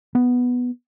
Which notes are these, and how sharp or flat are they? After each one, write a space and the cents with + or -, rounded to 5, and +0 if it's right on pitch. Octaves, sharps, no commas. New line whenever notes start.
B3 +0